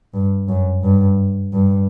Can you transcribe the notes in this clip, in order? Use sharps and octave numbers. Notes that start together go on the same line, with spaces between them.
G2
F#2
G2
G2